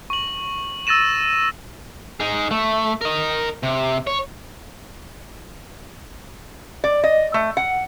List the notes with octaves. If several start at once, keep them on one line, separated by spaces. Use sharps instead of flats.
C#6 F#7
E6 A6 A#6 D#7 E7
D#4 G#4
A3
A#4 D#5
C3
C#5
D5
D#5
A3
F#5